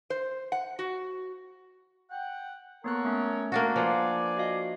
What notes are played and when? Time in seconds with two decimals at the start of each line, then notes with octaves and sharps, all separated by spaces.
0.10 C5
0.52 F#5
0.79 F#4
2.11 F#5 G5
2.84 A#3 B3 A4 A#4 C#5 F#6
3.05 A3 C#4
3.52 A#3 D4 F#4
3.76 F3 B4 D5 F5 F#5 G#5 D6
4.37 F#4 D#5 F5